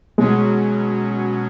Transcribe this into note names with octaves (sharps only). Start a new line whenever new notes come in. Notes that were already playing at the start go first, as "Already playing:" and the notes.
B2 F#3 G#3 C#4